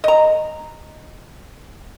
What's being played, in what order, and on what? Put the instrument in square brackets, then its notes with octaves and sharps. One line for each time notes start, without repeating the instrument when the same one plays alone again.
[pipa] D#5 A#5